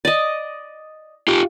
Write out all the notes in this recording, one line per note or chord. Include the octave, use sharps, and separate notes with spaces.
D5 D#5
F4 G4